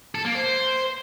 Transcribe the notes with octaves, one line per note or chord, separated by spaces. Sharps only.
A4
A#3
C5